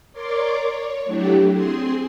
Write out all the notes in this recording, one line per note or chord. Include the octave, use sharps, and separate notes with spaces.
A#4 C#5 D5 C6 D6
C#5
F#3 A3 D4 E4 G4
C4 G#4 C6